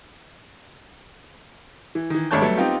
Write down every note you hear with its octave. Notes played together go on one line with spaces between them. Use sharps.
E3
D#3 E3
G#1 A3 D4 C#5 A5 G6
F#3 G3 A3 B3
B3 C4 D#4 F4 G4